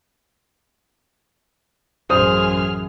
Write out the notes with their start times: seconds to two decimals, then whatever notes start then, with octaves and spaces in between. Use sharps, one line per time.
2.10 A1 F#2 G#4 C5 D#6 F6